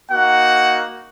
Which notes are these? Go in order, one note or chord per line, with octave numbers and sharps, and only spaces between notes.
A#3 D#4 F#4 F#5